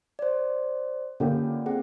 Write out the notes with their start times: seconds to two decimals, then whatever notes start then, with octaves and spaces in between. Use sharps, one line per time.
0.19 C5 D5
1.20 D3 A#3 C#4 D4 F4 G4
1.66 C4 G#4 F#5